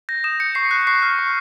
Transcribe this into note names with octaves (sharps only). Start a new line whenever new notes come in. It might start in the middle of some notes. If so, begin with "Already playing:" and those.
G6 A#6
D#6 E7
G6 C#7
C#6 C7
F#6
C#6 C7
F6
C#6